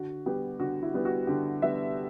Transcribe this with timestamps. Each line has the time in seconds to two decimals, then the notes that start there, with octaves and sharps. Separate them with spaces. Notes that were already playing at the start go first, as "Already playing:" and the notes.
Already playing: D3 F#4
0.26 G3 B3 G4
0.60 D3 F#4
0.82 E4
0.94 G3 B3
1.05 F#4
1.27 D3 G4
1.62 G3 B3 E5